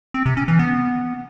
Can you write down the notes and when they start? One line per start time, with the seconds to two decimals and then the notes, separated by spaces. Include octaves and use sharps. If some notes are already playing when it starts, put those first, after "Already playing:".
0.14 C4
0.26 C3
0.37 C#4
0.48 E3
0.59 B3